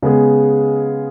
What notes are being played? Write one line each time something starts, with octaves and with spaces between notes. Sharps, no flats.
C#3 G#3 B3 G#4